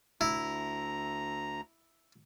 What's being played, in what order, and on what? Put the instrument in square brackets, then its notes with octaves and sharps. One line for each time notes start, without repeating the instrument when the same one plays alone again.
[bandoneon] D2 A#5 [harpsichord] E4